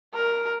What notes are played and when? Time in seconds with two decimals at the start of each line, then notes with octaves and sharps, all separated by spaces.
0.14 A#4